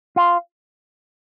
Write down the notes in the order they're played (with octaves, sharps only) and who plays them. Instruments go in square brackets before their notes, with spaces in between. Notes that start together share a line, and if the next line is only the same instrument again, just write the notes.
[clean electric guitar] F4